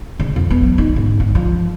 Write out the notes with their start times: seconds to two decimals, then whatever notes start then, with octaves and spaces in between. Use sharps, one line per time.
0.19 C#3
0.36 F2
0.50 B3
0.63 F#3
0.78 D#4
0.96 G#2
1.20 G1
1.35 F3